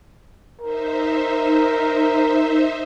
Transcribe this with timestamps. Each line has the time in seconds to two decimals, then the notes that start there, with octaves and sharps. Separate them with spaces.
0.61 D#4 A#4 C5 E5